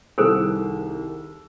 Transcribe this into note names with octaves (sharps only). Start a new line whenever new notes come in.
C2 D#3 G#4 A4 C5 E6